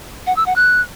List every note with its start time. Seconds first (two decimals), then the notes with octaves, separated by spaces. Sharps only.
0.27 F#5
0.36 E6
0.46 F#5
0.56 F#6